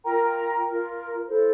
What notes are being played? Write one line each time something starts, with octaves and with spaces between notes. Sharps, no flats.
F4 A#4 G5 A#5
F4 A#4
E4 A4 C5